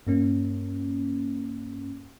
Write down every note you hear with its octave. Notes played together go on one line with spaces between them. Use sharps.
G2 A#3 C#4